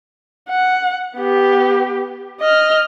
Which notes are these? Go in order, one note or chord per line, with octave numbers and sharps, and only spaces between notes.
F#5
B3 G4
D#5 F6